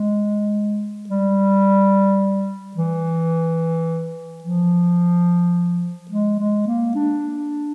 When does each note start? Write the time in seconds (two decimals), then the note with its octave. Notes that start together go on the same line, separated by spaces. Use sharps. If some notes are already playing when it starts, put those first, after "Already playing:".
Already playing: G#3
1.09 G3
2.76 E3
4.44 F3
6.11 G#3
6.39 G#3
6.67 A#3
6.95 D4